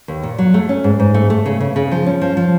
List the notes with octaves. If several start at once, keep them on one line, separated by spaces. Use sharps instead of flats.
D#2
A#2
F#3
A3
C#4
G#2
G#2
A3
A3
C#3
C#3
C#3
F3
C#4
F3
F3